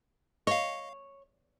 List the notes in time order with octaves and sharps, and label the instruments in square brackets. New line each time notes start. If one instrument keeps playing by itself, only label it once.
[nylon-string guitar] C#5 [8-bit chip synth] D#5 F5